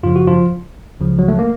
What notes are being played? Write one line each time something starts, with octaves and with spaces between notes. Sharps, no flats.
F#2 C#3 F3 F4
F#4
F3 F4
C#2 C#3 F3
F#3
A3
A#3